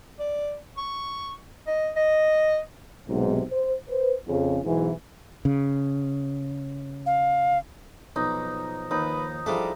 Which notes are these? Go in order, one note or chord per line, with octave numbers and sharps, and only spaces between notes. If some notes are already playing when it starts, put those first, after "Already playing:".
D5
C#6
D#5
D#5
B1 G#2 C3
C5
B4 C5
F2 C#3
B1 G#2 E3
C#3
F5
B1 F3 D#4
D#2 D#4 B4
F3 G3 D4 E4 G#4 A4 E5